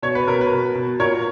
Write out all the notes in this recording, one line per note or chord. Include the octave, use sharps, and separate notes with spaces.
B2 C#5
B4
B2 A#4
B4
B2
B2
A#2 A#4 C#5